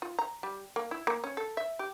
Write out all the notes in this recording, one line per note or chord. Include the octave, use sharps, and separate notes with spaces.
F4
A#5
G3
A#3
E4
A#3
C#4
A4
E5
G4